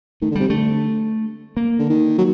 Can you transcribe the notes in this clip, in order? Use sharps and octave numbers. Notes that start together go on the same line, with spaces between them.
D#3 A3
D3
C3 G3
D3 A3
A#3
D3
D#3
F#3